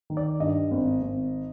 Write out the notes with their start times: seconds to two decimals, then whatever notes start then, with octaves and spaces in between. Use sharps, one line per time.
0.10 D#3
0.17 D5
0.40 G2 D#5
0.71 G#1
1.02 G#1